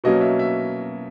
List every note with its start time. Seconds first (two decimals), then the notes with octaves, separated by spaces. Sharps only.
0.04 B2 F#3 A#3 C#4 D#5
0.21 E5
0.39 E5